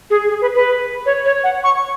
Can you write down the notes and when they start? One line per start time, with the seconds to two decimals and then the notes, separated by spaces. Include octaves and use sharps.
0.10 G#4
0.29 G#4
0.41 B4
0.55 B4
1.06 C#5
1.25 C#5
1.44 F#5
1.64 C#6